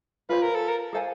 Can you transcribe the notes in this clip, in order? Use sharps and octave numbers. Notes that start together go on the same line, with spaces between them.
F4 G#4 B4 C5
A#4
A4
A#4
G#4 A4 C5 F5 G#5